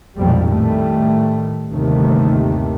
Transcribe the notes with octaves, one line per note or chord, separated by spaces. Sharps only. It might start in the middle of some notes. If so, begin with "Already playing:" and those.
A#1 F2 G#2 B2 F3 G3
A2 D#3 G3 A3
G1 D#2 C3 D#3 A3